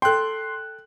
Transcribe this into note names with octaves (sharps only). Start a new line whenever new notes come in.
A4 G5 C6 F#6